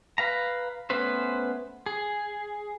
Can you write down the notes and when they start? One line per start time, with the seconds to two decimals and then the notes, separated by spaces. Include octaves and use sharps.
0.18 B4 F5 A#5
0.90 A3 B3 C#4 B4 C5
1.86 G#4